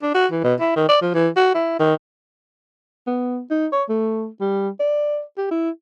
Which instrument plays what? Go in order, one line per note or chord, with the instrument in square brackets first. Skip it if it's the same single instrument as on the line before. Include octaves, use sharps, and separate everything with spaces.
[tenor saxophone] D4
F#4
E3
B2
E4
D#3
D5
F3
E3
F#4
E4
D#3
[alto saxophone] B3
D#4
C#5
A3
G3
D5
G4
E4